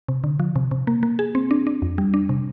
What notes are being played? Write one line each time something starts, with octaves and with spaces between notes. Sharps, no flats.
C3
D3
F3
C3
C3
A#3
A#3
G#4
C4
D4
D4
F2
G3
D4
C3